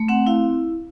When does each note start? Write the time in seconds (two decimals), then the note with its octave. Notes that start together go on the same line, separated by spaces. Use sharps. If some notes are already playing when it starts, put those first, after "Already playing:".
Already playing: A3
0.08 C4 F#5
0.26 E4 F5